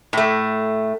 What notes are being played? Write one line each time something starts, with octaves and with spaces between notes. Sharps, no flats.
A2 A3